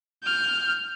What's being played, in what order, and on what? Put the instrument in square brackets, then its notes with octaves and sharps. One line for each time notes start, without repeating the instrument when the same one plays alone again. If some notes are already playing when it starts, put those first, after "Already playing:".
[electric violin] F6 G6